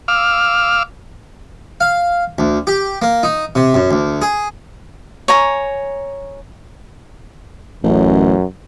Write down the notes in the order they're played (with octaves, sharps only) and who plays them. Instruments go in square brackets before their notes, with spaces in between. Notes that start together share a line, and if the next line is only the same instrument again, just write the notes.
[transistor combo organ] F5 D6 E6 F6
[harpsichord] F5
D2
G4
A#3
D#4
C3
F#2
D2
G#4
[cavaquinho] C#5 G#5 A#5
[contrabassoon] A1 [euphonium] F#2